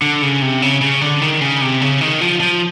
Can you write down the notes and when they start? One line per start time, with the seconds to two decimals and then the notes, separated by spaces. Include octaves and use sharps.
0.02 D3
0.22 C#3
0.42 C3
0.62 C#3
0.81 C#3
1.01 D3
1.21 D#3
1.41 C#3
1.61 C3
1.81 C#3
2.01 D#3
2.21 F3
2.40 F3